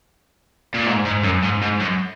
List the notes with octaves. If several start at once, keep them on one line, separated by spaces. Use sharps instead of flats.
A#2
G#2
G#2
F#2
G#2
G#2
F#2